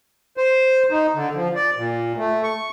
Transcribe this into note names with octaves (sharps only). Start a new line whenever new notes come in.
C5
D#4
D3
F3
D5
A#2
A3
C#6